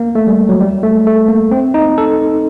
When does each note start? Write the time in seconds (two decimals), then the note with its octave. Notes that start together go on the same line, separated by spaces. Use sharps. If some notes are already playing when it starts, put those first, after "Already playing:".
Already playing: A#3
0.15 A3
0.27 G3
0.49 F#3
0.61 G3
0.83 A3
1.07 A3
1.28 A#3
1.51 C4
1.74 D#4
1.98 A4